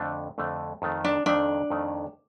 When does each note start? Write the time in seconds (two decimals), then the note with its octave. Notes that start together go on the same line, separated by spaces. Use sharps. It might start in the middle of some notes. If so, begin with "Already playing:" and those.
Already playing: F2 D3 A3 D4
0.38 F2 D3 A3 D4
0.82 F2 D#3 A3
1.05 D4
1.26 F2 D#3 A3 D4
1.70 F2 D#3 A3